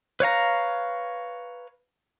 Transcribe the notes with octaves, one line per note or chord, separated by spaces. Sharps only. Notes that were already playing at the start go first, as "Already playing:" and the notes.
B4 C#5 F5 A#5